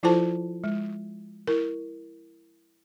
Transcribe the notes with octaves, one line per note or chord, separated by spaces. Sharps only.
F3 E4 F4 A4 C5 A5
G#3
E4 A#4